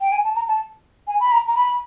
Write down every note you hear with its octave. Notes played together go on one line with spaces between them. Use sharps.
G5
G#5
A5
A#5
A5
G#5
B5
A#5
A#5
B5